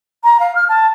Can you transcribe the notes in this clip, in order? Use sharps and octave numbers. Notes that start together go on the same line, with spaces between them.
A#5
F5
F6
A5